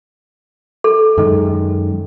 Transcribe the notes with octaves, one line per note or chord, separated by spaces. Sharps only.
A4
F#2 D#3 G#3